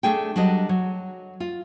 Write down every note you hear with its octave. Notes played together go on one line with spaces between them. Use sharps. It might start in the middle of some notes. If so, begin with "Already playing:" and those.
A3 D4 G#4 G5
F#3 G3 D4 A4 D#5
F#3
F4